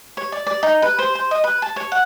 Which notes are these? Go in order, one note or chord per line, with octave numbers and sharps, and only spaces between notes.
C#5
D5
D5
D#4
B4
C5
C5
D#5
B4
A5
C#5
F#5